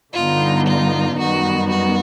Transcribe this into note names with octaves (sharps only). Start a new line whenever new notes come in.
G2 D3 G3 B3 D#4 F4
F4
F#2 D#3 G3 B3 D#4 F#4
F#4